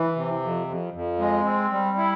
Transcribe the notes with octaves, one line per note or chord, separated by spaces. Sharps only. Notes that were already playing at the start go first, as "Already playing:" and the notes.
Already playing: E3
C3
F2
F2
F2
G#3
C4
G3
E4